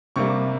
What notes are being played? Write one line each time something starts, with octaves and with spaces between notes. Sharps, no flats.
C3 G3 A#3 C#6